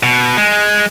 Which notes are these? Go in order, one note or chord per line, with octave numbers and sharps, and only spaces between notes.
B2
G#3